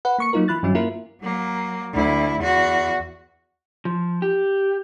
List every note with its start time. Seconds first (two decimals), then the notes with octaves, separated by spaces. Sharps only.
0.05 B4 F#5
0.18 A#3 C#6 C#7
0.33 F#3 A#3 D#4 F4 A#4
0.48 E3 E4 B5 F#6 A6
0.63 G2 D#3 F#3 C#4 E4
0.75 A#3 E4 F4 A#4
1.22 F#3 A#3
1.93 D2 E4
2.40 E2 F#4
3.85 F3
4.22 G4